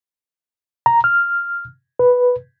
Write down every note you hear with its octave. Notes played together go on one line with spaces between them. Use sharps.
A#5
F6
B4